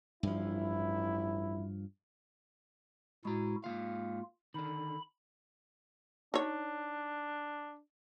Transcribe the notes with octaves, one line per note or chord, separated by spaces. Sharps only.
A1 G2 F3 E4
A2 G#3 E4 F#4 A#5
G#2 D#3 A#3 F4 F5
D3 D#3 B5
D4 D#4 C#5